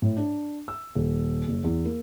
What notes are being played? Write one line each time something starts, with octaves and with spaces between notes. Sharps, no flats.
A2
D4
E6
D#1
F#1
E2
A#3